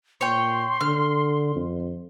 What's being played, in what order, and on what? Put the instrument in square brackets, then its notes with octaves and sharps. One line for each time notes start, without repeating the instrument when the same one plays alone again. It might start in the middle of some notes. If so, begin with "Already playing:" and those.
[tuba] A#2 [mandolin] C#5 G5 [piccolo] C6
[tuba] D3 [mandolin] F6
[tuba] F2